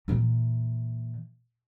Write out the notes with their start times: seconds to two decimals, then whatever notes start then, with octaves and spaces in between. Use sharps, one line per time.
0.08 A#2 E3